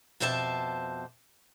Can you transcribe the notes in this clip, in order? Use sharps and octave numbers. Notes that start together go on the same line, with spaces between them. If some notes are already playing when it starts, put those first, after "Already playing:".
F2 B2 G4 C5 E5 A5